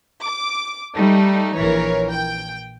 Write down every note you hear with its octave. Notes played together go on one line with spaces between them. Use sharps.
D6
G3 A3 D#4
A#1 E3 A#4 C#5
G5